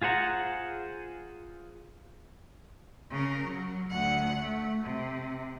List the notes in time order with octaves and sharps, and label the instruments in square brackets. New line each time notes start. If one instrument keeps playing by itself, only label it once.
[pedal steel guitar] F4 G#4 C5 F#5 A#5
[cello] C#3 A#4
F#3
D2 F#5
A3
C3